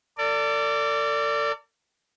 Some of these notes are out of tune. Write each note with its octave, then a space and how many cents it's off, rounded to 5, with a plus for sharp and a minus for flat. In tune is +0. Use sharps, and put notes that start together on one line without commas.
A4 +45 D5 -10